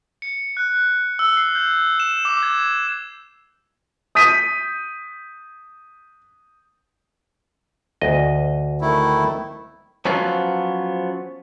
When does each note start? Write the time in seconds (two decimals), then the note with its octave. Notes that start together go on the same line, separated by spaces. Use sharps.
0.22 C#7
0.57 F#6
1.19 E6
1.37 C7
1.55 G6
2.00 E7
2.25 D6
2.43 G#6
4.15 D#6 G6 B6 D#7
8.02 D2 D#5
8.81 D#3 A3 E4
10.05 F3 F#3 B3 C#4 F4